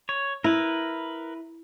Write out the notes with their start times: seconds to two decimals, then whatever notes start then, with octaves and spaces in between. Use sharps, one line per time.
0.09 C#5
0.44 E4 A#4 B4